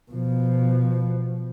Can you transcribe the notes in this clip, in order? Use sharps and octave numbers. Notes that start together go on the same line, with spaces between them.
B2 F3